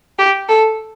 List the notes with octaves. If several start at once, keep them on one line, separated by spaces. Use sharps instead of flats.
G4
A4